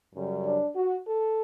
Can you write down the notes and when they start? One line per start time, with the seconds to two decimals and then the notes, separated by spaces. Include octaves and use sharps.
0.14 F#2 C#3 G3
0.44 D4
0.75 F#4
1.07 A4